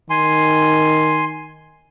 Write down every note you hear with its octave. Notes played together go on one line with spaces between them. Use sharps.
D#3 G#5 C6